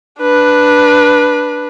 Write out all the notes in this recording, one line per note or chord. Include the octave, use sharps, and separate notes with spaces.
D4 B4